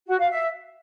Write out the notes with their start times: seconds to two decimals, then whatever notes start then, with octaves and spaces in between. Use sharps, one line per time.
0.08 F#4
0.19 F5
0.30 E5